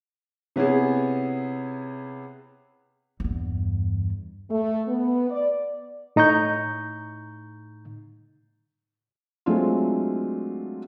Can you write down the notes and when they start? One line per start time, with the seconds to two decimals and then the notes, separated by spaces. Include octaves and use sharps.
0.56 C3 B3 C#4 E4 G#4
3.20 E2 G2
4.50 A3
4.88 B3
5.31 D5
6.16 A2 D#4 A#5 C#6 G6
9.46 F#3 G#3 A3 C4 D4 F4